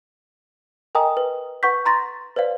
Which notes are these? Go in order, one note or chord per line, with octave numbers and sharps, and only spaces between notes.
A#4 D#5 G5 G#5 A#5 D#6
B4
B4 F#5 C#6 G6 B6
A#5 C6 A6 A#6
B4 C5 D5 F5